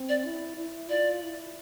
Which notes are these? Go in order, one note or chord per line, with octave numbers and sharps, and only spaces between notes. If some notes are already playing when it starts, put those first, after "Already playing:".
Already playing: C4
D5
E4
E4
F4 D5
E4